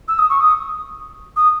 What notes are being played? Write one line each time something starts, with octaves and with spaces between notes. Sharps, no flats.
E6
D#6
C#6
D#6
D#6